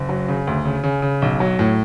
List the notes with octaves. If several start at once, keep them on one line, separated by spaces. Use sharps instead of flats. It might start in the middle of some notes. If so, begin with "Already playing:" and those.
Already playing: F#1
F#3
C#3
D2
C#3
C#3
C#3
B1
F#3
A2